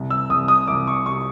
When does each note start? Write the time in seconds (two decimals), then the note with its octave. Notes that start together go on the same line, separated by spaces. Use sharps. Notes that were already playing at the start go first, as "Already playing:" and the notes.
Already playing: C2
0.10 E6
0.30 C2 D#6
0.48 D#6
0.67 C2 D6
0.87 C#6
1.06 C3 C#6